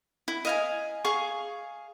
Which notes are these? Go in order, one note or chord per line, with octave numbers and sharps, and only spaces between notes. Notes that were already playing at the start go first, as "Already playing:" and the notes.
E4
D#5 F5 G#5
G#4 F5 C#6